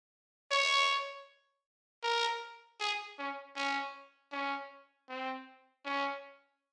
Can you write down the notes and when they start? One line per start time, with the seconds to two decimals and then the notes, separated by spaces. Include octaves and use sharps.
0.51 C#5
2.03 A#4
2.80 G#4
3.19 C#4
3.56 C#4
4.32 C#4
5.09 C4
5.85 C#4